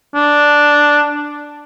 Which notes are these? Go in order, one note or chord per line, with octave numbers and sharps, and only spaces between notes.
D4